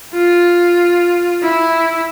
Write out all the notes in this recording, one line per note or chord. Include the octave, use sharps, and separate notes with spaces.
F4
E4